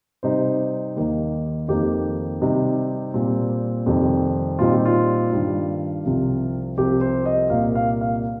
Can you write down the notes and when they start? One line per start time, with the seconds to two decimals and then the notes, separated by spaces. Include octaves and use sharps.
0.23 C3 G3 D#4 C5
0.96 D#2 D#3 A#3 D#4
1.68 F2 D#3 A#3 D#4 G4
2.41 C3 G3 D#4
3.14 A#2 G3 C4
3.86 F2 C3 D#3 G3 D#4
4.59 A#2 G3 C4 D#4 F4
4.72 G4
4.85 F4
5.32 G2 D#3 G3 D#4
6.05 C2 C3 F3
6.78 C2 C3 F3 C4 G4
7.01 C5
7.26 D#5
7.50 C2 A#2 A#3 F5
7.75 F5
8.01 F5